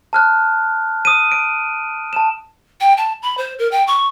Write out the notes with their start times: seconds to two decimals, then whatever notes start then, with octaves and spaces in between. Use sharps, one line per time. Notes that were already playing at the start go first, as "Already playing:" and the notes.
0.13 A5 F6 F#6
1.05 D#6 D#7
1.32 D7
2.13 A5 E7
2.81 G5
2.98 A5
3.23 B5
3.38 C5
3.59 A#4
3.71 G5
3.87 C#6